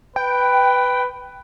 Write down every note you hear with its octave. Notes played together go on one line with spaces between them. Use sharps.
B4 G5